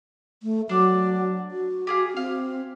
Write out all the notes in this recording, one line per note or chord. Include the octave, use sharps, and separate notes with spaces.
A3
F#3 D4 D5
F#4
G4 G#4 F5
C4 F5